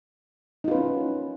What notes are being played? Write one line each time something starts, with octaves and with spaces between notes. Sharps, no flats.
C#4 D#4 F4 B4